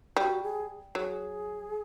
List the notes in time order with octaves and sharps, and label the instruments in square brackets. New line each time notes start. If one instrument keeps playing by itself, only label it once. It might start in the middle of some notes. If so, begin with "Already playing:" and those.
[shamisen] G3 [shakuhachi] F#4
[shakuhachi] G#4
[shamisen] F#3 [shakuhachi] G#4